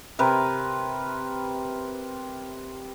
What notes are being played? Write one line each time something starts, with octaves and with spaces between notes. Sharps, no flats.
C3 A#4 B4